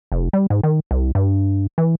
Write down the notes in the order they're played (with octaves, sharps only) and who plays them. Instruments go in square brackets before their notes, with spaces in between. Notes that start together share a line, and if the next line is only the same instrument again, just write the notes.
[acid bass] F1
G3
G#2
D#3
C2
G2
E3